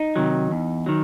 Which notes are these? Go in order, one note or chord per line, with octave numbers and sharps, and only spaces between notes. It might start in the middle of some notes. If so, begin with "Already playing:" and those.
Already playing: D#4
C3 D#3 F#3
E2
D#3 F#3